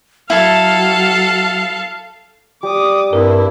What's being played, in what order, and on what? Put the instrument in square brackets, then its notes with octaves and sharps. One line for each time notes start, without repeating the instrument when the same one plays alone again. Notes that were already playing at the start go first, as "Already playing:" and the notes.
[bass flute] F#3 [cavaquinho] E4 [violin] A4 [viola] F5
[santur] G3 [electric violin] D6 D#6
[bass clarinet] G2 [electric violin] C4 E4 [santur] D4 B5 [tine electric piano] A#4